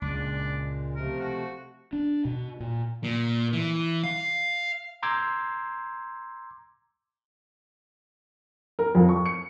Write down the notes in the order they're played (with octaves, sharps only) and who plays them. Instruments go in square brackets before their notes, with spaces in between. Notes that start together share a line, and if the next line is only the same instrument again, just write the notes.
[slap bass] C#2 [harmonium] A#2 G#3 [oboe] D4
[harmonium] C3 F3 A3 [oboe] A#4
[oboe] F#4
[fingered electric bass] D4
B2
A#2
[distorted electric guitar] A#2
E3
F5
[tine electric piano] A#5 C6 D6 E6 G6 G#6
[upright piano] A#4
F2
C#6
C#7